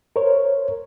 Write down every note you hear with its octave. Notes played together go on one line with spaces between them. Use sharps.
A#4 C5 C#5